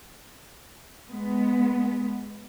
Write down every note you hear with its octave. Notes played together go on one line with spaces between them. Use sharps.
G#3 B3